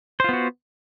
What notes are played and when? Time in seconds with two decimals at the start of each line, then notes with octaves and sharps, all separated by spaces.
0.20 C5
0.24 F4
0.29 B3
0.33 F#4